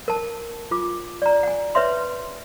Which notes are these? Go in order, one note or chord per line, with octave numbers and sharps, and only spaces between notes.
A#4 A5
F4 D6
D5 A#5
F#5 G#5
B4 C#5 E5 C6